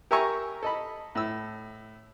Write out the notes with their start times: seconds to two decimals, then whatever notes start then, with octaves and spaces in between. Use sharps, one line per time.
0.11 G4 A#4 E5 G#5 A#5 C#6
0.63 A4 D#5 B5
1.15 A2 E6